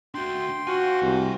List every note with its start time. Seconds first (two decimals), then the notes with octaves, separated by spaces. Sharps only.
0.15 D4 F#4 G5 C6
0.67 F4 F#4 C5 G#5
1.02 C2